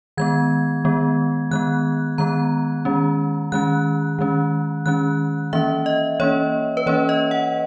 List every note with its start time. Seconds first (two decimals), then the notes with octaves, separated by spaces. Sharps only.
0.17 D#3 G#3 B3 G#6
0.85 D#3 G#3 B3
1.51 D#3 G#3 B3 F#6
2.18 D#3 G#3 B3 A#5
2.85 D#3 G#3 C#4
3.52 D#3 G#3 C#4 F#6
4.19 D#3 G#3 C#4
4.86 D#3 G#3 C#4 F#6
5.53 E3 A#3 C#4 E5
5.86 D#5
6.20 E3 A#3 C#4 C#5
6.77 B4
6.86 E3 A#3 C#4 C#5
7.09 D#5
7.31 F#5